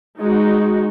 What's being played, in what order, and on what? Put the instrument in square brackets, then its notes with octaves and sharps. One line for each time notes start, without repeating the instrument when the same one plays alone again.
[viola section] G#3 D#4 F#4